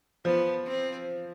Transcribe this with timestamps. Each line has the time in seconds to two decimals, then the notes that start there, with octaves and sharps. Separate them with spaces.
0.25 F3 B3
0.66 C4